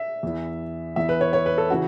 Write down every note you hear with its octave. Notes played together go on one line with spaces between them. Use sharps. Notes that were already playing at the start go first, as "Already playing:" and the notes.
Already playing: E5
E2 E3
E2 E3 E5
B4
C#5
C#5
B4
A4
C#3 E3 F#4